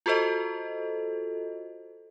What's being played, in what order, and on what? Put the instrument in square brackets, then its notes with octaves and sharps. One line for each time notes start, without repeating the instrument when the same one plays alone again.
[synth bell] F4 F#4 A4 C5 D#5